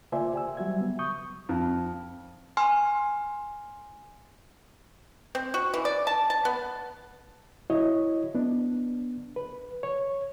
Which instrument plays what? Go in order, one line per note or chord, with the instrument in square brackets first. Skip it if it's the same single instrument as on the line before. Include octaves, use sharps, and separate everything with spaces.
[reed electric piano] A#3 F4 C5 D5 E5 G#5
G4 G#5 E6
F#3 G3 F#4 E5 G#6
B3
C#6 D#6 G6
[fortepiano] F2
[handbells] G#5 C6 F6
[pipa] C4
F#4
E3
D5
A5
A5
B3
[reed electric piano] E4 F#4 C#5 D#5
B3 D4
B4
C#5